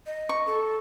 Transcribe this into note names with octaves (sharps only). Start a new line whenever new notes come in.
D#5
C#6
A4